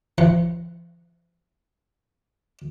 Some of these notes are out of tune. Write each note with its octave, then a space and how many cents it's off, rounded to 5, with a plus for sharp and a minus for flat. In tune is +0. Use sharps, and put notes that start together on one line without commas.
F3 -35 F#5 +0